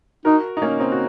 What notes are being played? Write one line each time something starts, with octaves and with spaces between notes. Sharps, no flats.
D#4 F#4 A#4
D#4
A#3 C#4
C4 D#4
F#4